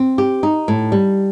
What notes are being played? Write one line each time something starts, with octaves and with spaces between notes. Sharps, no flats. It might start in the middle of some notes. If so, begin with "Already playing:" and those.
Already playing: C4
G4
D#4
A2
G3